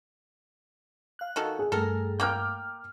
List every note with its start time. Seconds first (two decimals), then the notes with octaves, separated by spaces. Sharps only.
1.19 F5 F#6
1.36 D#3 F#4 A4
1.59 G#4
1.72 G2 A3 A4 A#4
2.20 A#3 G5 D6 F6